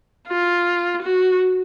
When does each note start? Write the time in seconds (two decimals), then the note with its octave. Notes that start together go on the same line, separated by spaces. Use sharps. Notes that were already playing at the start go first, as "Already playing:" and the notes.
0.29 F4
1.02 F#4